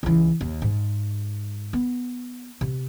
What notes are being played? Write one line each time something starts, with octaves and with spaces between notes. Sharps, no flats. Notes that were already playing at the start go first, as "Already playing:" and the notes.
C#2 E3
D#2
G#2
B3
C3